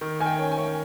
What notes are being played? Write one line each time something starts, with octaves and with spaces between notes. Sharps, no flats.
D#3
D#3 G#5
G5
C#4
G#5
C#4